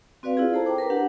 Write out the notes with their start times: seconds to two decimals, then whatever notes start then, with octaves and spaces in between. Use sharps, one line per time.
0.23 C4 F#4 B4 D5 F5
0.37 E4 F4 G#4
0.53 A4 C5 A5 A#5
0.66 G5 D6
0.78 A#4 B4 A#5
0.90 D4 G4 F#5